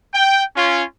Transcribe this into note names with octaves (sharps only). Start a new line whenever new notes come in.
G5
C#4 F4